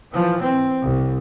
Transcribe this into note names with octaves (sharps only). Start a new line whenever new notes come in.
E3 F3
C4
C2